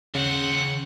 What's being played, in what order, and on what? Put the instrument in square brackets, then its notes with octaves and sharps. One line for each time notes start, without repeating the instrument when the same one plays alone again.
[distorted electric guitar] D#2 C5 [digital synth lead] C#3 [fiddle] F#5